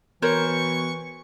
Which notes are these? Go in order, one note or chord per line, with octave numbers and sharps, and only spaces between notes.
B2 E3 A#4 C5 C#5 C#6